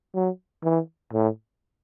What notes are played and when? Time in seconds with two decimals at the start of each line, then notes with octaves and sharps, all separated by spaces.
0.15 F#3
0.63 E3
1.13 A2